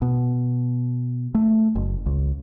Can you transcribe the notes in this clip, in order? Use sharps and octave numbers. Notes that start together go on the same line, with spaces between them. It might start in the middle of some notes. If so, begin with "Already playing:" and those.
B2
A3
F#1
C#2